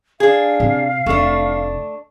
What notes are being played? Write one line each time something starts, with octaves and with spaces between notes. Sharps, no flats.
D4 G#4 F5
C3
F1 A3 D4